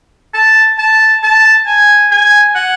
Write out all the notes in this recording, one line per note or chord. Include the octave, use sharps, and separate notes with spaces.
A5
A5
A5
G#5
G#5
F#5